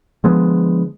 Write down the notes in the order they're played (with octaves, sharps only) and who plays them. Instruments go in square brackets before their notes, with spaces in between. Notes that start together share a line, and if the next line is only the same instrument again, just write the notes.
[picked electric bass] D3 F3 G#3 B3